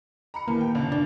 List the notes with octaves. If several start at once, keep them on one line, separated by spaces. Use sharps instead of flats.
A#5 B5 C#7
D#2 E3 A#3
G5
G1 C#3
D4